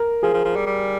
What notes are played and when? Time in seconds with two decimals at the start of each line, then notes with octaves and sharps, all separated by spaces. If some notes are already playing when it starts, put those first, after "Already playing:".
Already playing: A#4
0.23 F3 G#4
0.34 F3
0.45 F3
0.56 G3
0.66 G3